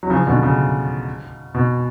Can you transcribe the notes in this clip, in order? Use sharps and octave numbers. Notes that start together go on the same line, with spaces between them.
F#3
C#3 F3
B2 D3
C#3
B2